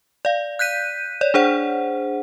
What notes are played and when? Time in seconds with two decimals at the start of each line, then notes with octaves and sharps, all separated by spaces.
0.25 D5 F5
0.59 F#6 G6 B6 D#7
1.21 C#5 D5
1.34 D4 G#4 C5 F#5